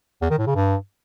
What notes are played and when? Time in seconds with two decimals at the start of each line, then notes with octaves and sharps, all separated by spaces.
0.22 E2
0.30 D#3
0.39 A2
0.47 C#3
0.55 G2